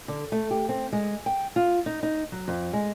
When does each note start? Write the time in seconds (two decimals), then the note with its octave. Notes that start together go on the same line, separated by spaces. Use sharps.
0.08 D3
0.32 A3
0.51 G4
0.69 C4
0.92 G#3
1.26 G5
1.56 F4
1.86 D#4
2.03 D#4
2.32 F#3
2.48 F2
2.73 G#3